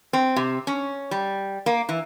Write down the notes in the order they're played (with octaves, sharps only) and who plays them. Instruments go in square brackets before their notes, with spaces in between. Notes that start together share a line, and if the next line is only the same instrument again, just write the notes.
[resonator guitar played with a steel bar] C4
C3
C#4
G3
A#3
E3